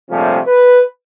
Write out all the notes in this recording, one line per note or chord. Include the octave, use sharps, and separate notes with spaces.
A#1 C3 F3 G3 A3 C#4
B4